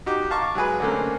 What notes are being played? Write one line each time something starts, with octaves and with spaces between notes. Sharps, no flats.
D#4 F#4 G4
F5 A5 A#5 C#6 D6
F#3 G#3 G#4 B4
D3 A3 A#3 C4 C#4